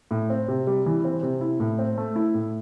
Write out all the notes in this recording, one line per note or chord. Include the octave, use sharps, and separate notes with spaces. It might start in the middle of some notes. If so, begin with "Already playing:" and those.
A2
C4
C3
G3
E3
C4
C3
E4
A2
C4
A3
E4
A2